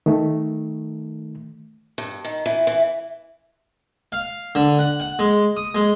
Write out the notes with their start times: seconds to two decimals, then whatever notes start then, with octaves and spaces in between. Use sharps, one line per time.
0.06 D#3 A3
1.98 G2
2.25 D#3
2.46 E3
2.67 E3
4.12 F5
4.55 D3
4.79 F#5
5.00 F#5
5.19 G#3
5.57 D#6
5.75 G#3